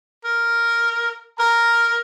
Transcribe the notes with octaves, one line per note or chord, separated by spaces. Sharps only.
A#4
A#4 A#5